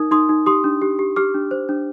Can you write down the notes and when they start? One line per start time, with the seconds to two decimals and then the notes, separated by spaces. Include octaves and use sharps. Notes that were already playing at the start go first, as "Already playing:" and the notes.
Already playing: D#4 A#4 D#6
0.11 D#4 C6 D#6
0.29 D#4
0.46 G4 C6 D#6
0.64 D4
0.82 G4
0.99 G4
1.16 G4 D6 F6
1.34 D4
1.51 C5
1.69 D4